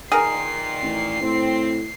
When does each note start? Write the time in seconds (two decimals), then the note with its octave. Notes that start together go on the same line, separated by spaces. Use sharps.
0.12 A#2 D#3 G#4 A#4 C7
0.82 A1
1.21 A2 C4